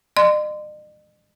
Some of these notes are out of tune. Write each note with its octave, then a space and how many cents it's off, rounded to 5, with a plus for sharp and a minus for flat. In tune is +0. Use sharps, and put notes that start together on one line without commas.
D#5 -45 C6 -20